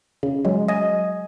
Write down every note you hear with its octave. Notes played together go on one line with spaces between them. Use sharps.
C#3
F#3 G#3
D#5 G#5